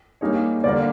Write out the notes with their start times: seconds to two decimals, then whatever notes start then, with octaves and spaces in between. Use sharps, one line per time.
0.21 G3 A#3 D#4 G#4 C#5
0.64 D3 G3 A#3 D5